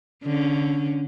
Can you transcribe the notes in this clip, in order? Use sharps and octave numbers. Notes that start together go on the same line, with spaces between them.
D3 C#4